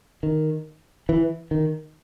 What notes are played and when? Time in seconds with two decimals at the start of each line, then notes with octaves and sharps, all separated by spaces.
0.23 D#3
1.09 E3
1.51 D#3